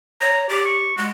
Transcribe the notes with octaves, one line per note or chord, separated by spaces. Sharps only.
C#5 A#5
G4 D5
C#6
G#3 F#4